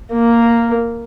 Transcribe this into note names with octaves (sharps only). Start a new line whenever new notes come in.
A#3